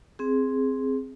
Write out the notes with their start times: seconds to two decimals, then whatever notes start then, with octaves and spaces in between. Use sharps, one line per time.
0.19 C4 G#4